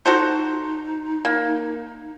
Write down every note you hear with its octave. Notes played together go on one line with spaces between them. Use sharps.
D#4 F#4 A4 C5
A#3